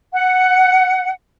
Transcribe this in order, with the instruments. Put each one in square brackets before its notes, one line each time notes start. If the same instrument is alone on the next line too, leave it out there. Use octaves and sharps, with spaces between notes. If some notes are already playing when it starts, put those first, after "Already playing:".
[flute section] F#5